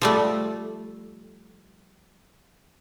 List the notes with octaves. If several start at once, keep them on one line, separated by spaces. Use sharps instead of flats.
F3 G3 A3